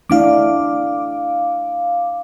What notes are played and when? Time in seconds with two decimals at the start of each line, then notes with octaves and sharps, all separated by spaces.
0.10 A3 D4 E4 F5 D6